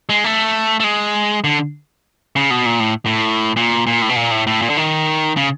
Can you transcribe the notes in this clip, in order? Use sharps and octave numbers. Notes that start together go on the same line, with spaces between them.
G#3
A3
A3
G#3
D3
C#3
B2
A#2
A2
A2
A#2
A#2
A2
B2
A#2
A2
A2
A#2
D3
D#3
C#3